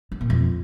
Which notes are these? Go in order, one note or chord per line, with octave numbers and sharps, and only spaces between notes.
D3
A#2
F2